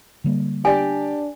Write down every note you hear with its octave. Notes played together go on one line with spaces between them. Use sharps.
D3 G3 A#3
D4 G4 D5 G#5